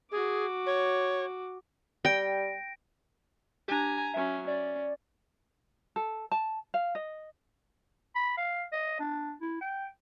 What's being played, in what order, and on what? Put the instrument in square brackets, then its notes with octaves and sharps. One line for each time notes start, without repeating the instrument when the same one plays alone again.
[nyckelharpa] F#4 D6 [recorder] G#4
[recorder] C#5
[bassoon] G3 [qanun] G5 [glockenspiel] A#6 D7
[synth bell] D4 G4 [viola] G#5 A#5
[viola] F#3 C#4 [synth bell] E5
[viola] C#4 [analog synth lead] D5
[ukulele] A4
A5
F5
D#5
[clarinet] B5
F5
D#5
D4
E4
G5